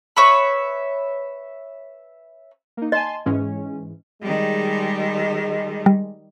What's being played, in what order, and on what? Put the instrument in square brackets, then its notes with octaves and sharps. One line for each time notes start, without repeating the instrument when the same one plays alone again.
[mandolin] B4 C#5 E5 B5
[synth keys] A#3 D#4
[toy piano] D#5 [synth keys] G#5 A5 C6
[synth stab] G#2 E3 G#3 [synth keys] C#4
[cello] D#3 G3 [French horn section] G#3
[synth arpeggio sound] G3